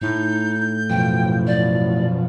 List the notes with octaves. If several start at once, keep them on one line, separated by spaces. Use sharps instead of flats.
A2 D#4 G6
F#2 B2 F3 G5
D5